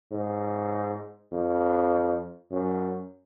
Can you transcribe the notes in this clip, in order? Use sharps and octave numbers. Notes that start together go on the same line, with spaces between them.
G#2
F2
F#2